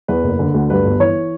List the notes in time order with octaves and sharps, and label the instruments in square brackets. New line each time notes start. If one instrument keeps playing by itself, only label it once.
[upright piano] E2 B4
F#1
D3
D2
G2 B4
G1
E3 C#5